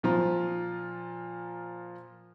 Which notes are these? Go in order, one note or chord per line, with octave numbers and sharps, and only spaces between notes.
A#2 F3 F4 A#5